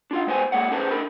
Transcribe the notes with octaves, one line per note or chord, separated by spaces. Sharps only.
D4 F4 F5
G#3 B3 C5 G#5
G#3 A#3 C#5 F#5
C#4 G#4 A4 B4 C5
D3 A#4 B5